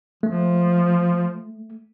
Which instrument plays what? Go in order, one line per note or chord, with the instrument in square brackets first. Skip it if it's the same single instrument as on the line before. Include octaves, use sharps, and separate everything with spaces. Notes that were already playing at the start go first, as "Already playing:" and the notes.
[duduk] F3 [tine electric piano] A3